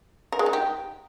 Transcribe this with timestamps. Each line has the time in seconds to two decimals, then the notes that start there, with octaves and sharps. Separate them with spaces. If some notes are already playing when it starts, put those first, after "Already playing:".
0.32 A#4
0.39 G#3
0.46 D#4
0.53 G4